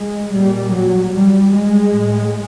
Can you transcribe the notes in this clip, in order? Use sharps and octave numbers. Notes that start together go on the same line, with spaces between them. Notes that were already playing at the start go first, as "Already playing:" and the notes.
Already playing: G#3
A#2 G3
F#3
G3
G#3
A2